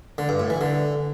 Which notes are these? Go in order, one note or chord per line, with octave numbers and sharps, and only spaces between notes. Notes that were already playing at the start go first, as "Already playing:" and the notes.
D3
G2
A2
E3
D3